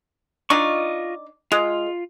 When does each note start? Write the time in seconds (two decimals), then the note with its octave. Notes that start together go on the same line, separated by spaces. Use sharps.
0.50 D4 D#4 F4 D5 D#5 C#6
1.52 G#3 F4